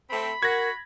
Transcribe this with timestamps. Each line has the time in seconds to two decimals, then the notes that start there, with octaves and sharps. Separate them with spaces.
0.10 A3 C4 B5
0.43 F#4 A#4 G#6 A#6